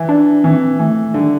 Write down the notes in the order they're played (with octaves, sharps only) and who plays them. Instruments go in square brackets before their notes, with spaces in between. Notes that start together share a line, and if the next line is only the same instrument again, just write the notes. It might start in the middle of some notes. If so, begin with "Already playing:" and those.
Already playing: [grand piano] E3
[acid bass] D4
[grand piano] E3 [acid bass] C4
[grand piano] E3 [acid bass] A3
[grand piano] D3 [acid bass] G3